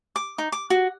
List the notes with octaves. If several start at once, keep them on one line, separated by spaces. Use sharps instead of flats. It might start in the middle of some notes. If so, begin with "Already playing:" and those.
D6
D#4
D6
F#4